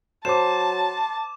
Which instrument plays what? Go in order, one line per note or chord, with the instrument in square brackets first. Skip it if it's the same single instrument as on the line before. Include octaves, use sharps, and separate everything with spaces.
[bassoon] F#3 [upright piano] C5 [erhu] A5 [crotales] D6 E7